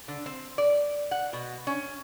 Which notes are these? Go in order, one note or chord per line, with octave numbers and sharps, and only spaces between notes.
D3
C4
D5
F#5
B2
C#4